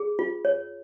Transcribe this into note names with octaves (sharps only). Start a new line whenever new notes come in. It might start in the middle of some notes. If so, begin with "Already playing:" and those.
Already playing: G#4
F4
C#5